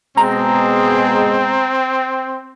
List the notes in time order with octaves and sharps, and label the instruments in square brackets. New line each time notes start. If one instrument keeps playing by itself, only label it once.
[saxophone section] B2 G#3 [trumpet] C4 [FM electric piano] A#5